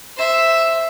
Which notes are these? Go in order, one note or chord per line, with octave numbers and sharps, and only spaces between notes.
C5 E5